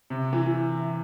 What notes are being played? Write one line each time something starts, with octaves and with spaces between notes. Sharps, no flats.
C3
E3